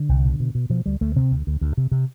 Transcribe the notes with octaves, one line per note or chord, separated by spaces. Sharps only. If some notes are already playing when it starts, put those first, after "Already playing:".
Already playing: D3
C2
B2
B2
B2
B2 F3
D2 G3
D2 A3
C3 C4
D2
D2
D2
C3
C3